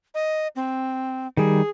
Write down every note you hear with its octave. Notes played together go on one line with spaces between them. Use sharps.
D#5
C4
D#3 G3 G#4